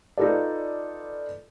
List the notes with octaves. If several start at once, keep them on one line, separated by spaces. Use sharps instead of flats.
D#4 F4 A4 B4 D5